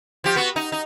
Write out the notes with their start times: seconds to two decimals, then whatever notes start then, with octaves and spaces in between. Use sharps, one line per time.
0.24 F3 G4
0.36 B3 F#4
0.56 D#4
0.72 D#4